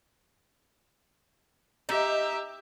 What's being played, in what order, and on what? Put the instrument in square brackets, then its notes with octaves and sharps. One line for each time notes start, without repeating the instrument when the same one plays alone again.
[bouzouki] D#4 [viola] G4 E5